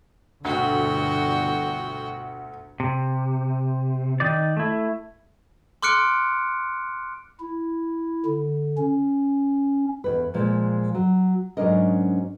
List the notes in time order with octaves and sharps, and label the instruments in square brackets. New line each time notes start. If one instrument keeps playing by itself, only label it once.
[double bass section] G1 B2 D3 [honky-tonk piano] D2 [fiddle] F#4 G5
[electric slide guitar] C3
D#3 D#4 D5
A3 E4
[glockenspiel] C6 D6 F6 F#6 C#7 D7
[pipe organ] E4
D3
C#4
[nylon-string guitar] E2 A#2 B4
A#2 F3 G#3
F#3
G#2 F#3 C#4 D4 A#4 D#5